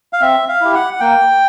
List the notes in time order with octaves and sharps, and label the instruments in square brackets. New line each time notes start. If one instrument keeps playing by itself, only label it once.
[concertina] F5
C4 E5
F5
E4 G4
F#5
F#5
A#3 G5